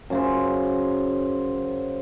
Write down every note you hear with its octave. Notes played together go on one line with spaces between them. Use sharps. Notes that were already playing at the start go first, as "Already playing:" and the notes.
F#2 C#3 C5